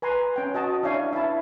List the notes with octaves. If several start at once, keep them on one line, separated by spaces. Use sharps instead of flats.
B4 G#5 A#5 C6
C#4 G5
F#4 D#5 A5
D4 E4 C#5 F5 G#5
E4 A5